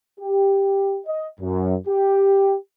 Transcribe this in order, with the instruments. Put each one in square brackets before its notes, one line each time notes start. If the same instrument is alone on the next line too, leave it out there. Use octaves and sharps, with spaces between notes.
[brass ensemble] G4
D#5
F#2
G4